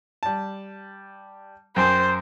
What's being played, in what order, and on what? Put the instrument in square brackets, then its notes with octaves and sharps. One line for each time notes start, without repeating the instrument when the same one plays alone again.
[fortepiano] G3 A5
[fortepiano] F#2 G5 G#5 [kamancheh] C5